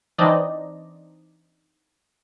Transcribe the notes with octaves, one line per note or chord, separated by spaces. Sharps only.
E3 C4 D4 D#4 D5 D#5